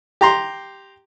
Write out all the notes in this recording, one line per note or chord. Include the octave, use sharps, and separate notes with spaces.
G4 A#5 C6